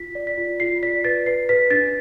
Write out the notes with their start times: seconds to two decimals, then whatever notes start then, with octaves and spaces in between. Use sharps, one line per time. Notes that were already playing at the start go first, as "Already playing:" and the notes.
Already playing: F4 B6
0.15 D5
0.27 B6
0.37 F4
0.60 F4 C7
0.83 D5 B6
1.04 B4 A6
1.26 B4 C7
1.49 B4 B6
1.70 D4 A6